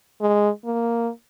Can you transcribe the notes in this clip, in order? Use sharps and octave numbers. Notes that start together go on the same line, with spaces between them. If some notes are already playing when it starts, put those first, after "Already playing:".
G#3
A#3